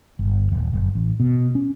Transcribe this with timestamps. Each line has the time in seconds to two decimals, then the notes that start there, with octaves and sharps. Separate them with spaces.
0.19 G1
0.52 D#1
0.73 F#1
0.95 A1
1.20 B2
1.55 C#4